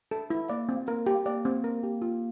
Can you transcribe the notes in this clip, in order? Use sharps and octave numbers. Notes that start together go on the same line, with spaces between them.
A4
E4
A#3 D5
C4
A#3 A#4
G4
A#3 D5
C4
A#4
G4
F4